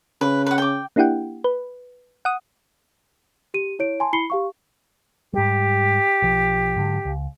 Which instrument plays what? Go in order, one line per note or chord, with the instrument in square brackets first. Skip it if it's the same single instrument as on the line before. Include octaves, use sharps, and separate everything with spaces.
[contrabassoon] C#3 [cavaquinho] B4
[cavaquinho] B4 F#5
G5 D6
[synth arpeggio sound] A#3 D4 E4 G4 F#5 G5
B4
F#5 D#6
[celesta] G4 D#7
E4 C#5 D7
G#5 A5 C6
E4 B5 C7 C#7 G7
G4 F5 C#6
[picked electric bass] G#2 G3 [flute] G4
[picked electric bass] B1 F3
G#2 D3 F#3
C#2